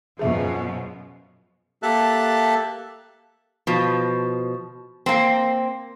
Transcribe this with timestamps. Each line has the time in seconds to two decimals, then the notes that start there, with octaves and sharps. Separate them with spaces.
0.19 F#2 B2 F3 G#4 E5
1.83 A#3 G4 A4 E5 A5 F#6
3.67 B2 F3
5.06 A#3 C4